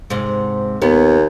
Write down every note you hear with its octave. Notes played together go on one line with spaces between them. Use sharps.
G#2 C3
D#2 B3